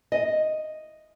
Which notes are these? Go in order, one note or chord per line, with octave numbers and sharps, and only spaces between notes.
D#5